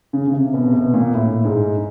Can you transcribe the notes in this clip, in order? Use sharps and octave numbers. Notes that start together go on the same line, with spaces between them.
C#3
C#3
C3
B2
C3
B2
A#2
A2
G#2